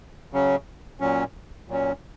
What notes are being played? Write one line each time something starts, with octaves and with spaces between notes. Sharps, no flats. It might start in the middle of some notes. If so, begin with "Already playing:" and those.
C#3 F#3 C#4
A#2 F#3 C#4
A#2 F#3 C#4